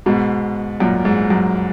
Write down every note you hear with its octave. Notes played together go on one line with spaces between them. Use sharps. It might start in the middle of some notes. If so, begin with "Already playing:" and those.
G#2 B2
F#2 A#2
G#2
F#2